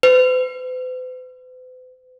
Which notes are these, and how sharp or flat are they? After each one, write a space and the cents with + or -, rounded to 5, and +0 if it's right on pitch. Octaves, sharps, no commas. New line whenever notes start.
B4 +45